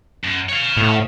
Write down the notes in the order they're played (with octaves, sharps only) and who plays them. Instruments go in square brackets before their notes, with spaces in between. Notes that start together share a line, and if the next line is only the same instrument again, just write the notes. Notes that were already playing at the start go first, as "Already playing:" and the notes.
[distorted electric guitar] F#2
C#5 F5
[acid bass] A2